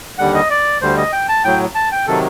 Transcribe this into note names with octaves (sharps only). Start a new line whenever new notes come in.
D#2 D3 G3 F#5
D#5
D5
D2 D3 G3 C5
D#5
G5
A5
A2 F#3 G5
A5
G5
C3 D#3 F#3 A4